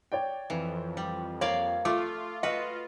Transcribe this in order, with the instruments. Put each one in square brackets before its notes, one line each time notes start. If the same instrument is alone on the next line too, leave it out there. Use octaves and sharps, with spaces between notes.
[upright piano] C#5 D5 G5
[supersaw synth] F2 [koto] E3
[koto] G3
[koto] A#3 D5 F5 [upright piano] C#5
[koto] A3 [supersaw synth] F4 [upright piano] D6
[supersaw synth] F4 [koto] F#4 B4 [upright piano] D#5